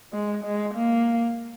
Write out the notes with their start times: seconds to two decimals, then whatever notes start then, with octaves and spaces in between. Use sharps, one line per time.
0.13 G#3
0.44 G#3
0.75 A#3